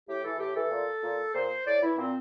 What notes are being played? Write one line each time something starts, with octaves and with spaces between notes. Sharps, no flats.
A2 G4
E3 A4
A2 G4
E3 A4
A#2
A#2
A#2 C5
A2 D5
E3 E4
A#2 C4